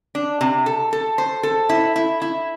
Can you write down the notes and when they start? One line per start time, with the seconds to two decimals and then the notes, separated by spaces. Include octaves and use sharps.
0.15 D4
0.41 C3
0.66 A4
0.93 A4
1.18 C5
1.43 A4
1.69 E4
1.96 E4
2.22 E4